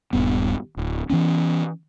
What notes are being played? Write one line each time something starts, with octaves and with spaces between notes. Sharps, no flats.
D#1 G2 B3
D1
E3 F#3 B3 C#4